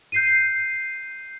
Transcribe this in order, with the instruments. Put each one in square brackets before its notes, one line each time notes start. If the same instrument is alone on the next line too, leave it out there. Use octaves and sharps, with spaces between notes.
[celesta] G6 C7 D#7